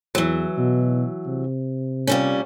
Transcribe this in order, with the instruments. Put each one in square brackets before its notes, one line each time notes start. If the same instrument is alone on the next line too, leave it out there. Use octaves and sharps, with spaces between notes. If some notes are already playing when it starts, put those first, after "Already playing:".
[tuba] E2 [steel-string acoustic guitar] E3 F#3
[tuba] B2
C3
[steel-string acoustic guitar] A#2 G3 C#4